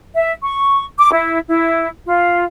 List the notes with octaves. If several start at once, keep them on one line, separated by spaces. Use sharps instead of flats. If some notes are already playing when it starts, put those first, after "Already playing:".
E5
C#6
D6
E4
E4
F4